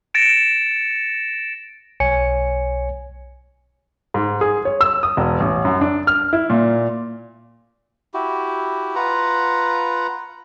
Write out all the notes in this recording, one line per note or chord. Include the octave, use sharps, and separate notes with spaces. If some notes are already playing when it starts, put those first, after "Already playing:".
A6 A#6 C#7 D7 E7
B1 C#5 G#5 C#7
G#2
G#4
C#5
E6
D#6
E1
A1
F#2
D4
F6
E4
A#2
E4 F#4 G4
F4 B4 F#5 A#5